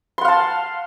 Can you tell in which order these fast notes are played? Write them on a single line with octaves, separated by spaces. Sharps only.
C6 F#5 F5 A5